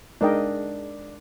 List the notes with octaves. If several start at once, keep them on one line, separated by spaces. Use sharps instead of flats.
G#3 D4 D#4 A#4 D#5 G5